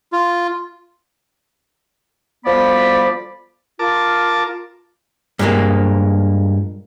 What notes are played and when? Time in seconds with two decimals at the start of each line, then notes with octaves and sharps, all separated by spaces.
0.13 F4
2.46 D2 F3 G3 B3 D5 B5
3.79 F4 A#4 A5 D6
5.39 G2 A#2 D#3 G#3 A#3